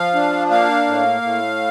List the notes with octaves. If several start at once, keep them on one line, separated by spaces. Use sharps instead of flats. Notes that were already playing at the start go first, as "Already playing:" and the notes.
Already playing: F3 F5
D4
A#3 F5
A2
A2